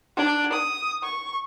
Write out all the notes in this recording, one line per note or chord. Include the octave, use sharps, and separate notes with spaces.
D4
D#6
C#6